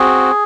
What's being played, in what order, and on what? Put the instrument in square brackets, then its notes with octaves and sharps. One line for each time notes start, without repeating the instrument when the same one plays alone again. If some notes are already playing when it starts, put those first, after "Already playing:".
Already playing: [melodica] C4 F#4 G#4